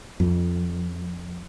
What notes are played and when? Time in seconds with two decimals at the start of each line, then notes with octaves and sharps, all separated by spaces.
0.20 F2